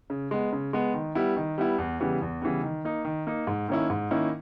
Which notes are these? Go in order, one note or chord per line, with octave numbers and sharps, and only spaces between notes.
C#3
G#3 B3
C#3
G#3 B3
D#3
G3 B3 E4
D#3
G3 B3 E4
E2
C#3 E3 G3 B3
E2
C#3 E3 G3 B3
D#3
A#3 D#4
D#3
A#3 D#4
G#2
D#3 A#3 C#4 E4
G#2
D#3 A#3 C#4 E4